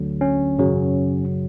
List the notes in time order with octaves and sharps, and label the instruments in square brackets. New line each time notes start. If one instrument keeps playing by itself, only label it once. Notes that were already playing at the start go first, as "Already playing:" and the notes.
Already playing: [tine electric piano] D2 D3 F#3
C#4
G#1 F#2 C#3 F#3